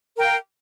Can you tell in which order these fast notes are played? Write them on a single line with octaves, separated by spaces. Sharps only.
A#4 G5 F5